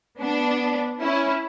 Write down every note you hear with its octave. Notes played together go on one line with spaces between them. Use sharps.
B3 D4
C#4 E4